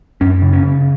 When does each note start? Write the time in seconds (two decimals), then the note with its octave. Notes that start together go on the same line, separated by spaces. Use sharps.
0.21 F#2 C#4
0.42 C#3
0.53 C#4
0.63 C#3